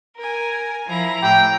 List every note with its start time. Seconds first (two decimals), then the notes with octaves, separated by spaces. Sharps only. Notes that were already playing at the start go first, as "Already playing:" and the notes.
0.16 A#4 G#5
0.87 F3 E4 A#5
1.23 A2 G5